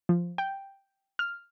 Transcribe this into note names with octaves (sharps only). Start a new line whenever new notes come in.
F3
G5
F6